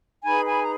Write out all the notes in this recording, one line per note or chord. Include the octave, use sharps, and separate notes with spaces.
D#4 G#4 B4 G#5 B5
G#5 B5
A#5